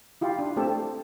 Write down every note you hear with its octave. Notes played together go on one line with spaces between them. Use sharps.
E4 F4 G4
D4
A3 C4 G4 A4